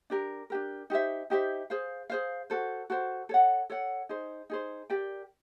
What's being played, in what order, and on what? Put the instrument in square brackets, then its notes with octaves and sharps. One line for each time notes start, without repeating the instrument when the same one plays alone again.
[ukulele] D4 G4 A#4
D4 G4 A#4
D#4 G4 C5 E5
D#4 G4 C5 E5
G#4 C5 F5
G#4 C5 F5
F#4 A4 C5
F#4 A4 C5
A4 C#5 F#5
A4 C#5 F#5
D#4 G#4 C5
D#4 G#4 C5
G4 A#4 D5 G5